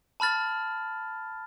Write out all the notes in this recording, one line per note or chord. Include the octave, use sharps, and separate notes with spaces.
A5 B5 F6 A6